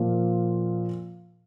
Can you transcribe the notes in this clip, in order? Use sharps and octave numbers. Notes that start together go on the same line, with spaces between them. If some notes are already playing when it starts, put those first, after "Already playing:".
Already playing: A#2 F3 A#3 F4